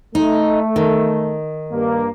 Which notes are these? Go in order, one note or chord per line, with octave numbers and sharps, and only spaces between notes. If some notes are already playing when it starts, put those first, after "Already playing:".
A3 D#4
D#3
G2 A#3